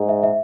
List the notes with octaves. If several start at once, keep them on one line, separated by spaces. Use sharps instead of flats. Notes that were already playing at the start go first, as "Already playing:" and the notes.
Already playing: G#2
E5
E5